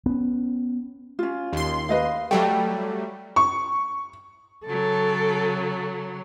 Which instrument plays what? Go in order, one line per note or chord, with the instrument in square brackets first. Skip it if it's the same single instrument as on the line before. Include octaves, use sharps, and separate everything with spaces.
[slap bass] B3 C#4
[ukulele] C#4 F4
[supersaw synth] D#2 C6
[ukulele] B4 D#5 F5
[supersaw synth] F#3 G3 A3 [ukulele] G5
[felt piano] C#6
[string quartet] C#3 F#3 [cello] A4